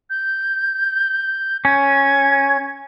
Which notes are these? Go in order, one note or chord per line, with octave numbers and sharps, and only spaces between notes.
G6
C#4 G#6